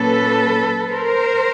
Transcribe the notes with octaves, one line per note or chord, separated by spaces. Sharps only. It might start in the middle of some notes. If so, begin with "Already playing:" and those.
Already playing: A#2 F#3 A#3 C#4 A4 B4
A#4 C5